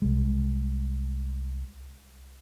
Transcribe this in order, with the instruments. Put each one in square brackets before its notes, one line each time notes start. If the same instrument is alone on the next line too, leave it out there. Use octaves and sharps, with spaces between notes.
[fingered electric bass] C2 G#3